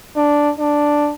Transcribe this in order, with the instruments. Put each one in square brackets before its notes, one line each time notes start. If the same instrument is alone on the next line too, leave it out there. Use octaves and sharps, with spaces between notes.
[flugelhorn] D4
D4